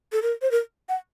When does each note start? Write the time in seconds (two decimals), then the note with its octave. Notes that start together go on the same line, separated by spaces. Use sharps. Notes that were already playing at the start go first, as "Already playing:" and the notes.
0.12 A4
0.22 A#4
0.42 C5
0.51 A#4
0.89 F#5